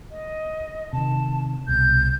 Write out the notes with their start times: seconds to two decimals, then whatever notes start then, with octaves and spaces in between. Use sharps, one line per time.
0.11 D#5
0.93 C3 D#3 A5
1.68 C2 B2 G6